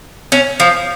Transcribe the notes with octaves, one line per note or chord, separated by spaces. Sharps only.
C#4
F3